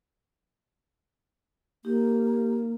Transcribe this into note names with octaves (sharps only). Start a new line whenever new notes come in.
A#3 D#4 G4